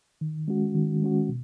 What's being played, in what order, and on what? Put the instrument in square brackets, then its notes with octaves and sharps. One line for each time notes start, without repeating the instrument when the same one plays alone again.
[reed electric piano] D#3
G#3 C#4 F#4
D#3
G#3 C#4 F#4
B2